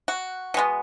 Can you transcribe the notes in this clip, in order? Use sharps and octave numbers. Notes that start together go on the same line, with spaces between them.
F#4
B2 G#3 B3